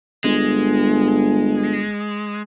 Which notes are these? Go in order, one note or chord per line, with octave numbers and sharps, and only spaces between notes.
G1 G#3